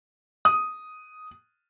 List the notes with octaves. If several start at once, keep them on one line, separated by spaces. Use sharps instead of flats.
D#6